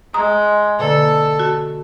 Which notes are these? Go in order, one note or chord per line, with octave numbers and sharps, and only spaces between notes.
G#3 A#5 D#6
B2 D3 A#3 A4
F#4